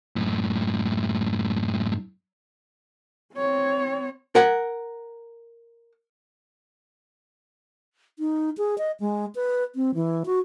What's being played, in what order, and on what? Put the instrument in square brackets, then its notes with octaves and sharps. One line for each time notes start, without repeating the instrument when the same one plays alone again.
[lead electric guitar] F#2 A2
[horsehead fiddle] C4 C#5
[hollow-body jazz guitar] A#4 F#5
[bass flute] D#4
G#4
D#5
G#3
B4
C4
E3
F#4